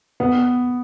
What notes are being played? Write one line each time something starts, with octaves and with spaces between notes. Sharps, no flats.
B3